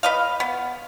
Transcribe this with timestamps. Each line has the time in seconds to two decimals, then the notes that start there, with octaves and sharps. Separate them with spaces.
0.03 B4 D#5 F5
0.40 B3